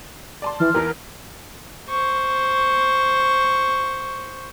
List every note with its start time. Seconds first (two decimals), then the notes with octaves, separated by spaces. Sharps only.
0.42 D5 A5 C6
0.60 E3 F6
0.74 E2 E3 A#4
1.89 C5 C#6